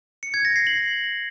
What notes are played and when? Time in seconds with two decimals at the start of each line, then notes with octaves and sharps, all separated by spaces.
0.23 C#7
0.34 G#6
0.45 A#6
0.56 C7
0.67 F#7